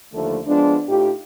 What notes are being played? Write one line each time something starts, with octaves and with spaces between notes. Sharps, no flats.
D#2 D3 F3 A3
F3 G#3 B3 D4
A2 D#4 F4 G4